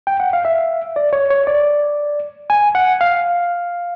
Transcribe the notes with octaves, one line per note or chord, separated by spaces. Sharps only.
G5
F#5
F5
E5
D5
C#5
C#5
D5
G#5
F#5
F5